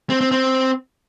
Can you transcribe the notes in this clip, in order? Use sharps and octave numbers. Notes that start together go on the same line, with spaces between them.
C4
C4
C4